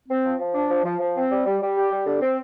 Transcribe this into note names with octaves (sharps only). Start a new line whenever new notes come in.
C4
F3
F3
D4
F3
F3
F3
C4
G3
G3
G3
G4
G3
D3
C4